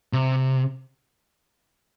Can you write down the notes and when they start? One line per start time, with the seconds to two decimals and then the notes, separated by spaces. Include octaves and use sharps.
0.13 C3